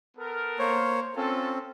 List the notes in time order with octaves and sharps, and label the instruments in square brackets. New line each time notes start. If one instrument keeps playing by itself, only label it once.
[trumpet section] B3 A4 A#4
[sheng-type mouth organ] A#3 C5 C#5
[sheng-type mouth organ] C4 C#4 [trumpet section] F4 A4